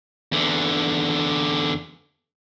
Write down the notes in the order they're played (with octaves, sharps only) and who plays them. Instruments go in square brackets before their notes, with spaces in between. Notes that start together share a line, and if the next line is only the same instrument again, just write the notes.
[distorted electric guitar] E2 D3